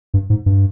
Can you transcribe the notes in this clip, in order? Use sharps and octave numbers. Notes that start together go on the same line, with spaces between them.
G2
G#2
G2